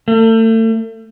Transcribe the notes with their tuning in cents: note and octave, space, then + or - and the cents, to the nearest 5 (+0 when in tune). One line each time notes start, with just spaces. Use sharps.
A3 +35